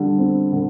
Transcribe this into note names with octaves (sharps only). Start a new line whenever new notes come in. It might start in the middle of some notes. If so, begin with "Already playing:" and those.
Already playing: D3 G3
C4
D3